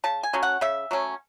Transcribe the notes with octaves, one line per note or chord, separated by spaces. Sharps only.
C#3 A5
G#5
F#3 A3 C#4
F#5
C#3 E5
F#3 A3 C#4